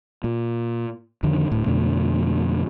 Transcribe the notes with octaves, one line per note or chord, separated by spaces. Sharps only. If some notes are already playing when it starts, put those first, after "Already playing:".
A#2
F2 D3 D#3
D1 A2
F2 B2 D3 A3